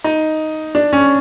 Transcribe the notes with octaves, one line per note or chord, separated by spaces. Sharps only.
D#4
D4
C#4